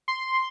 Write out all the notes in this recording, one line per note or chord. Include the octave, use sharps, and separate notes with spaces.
C6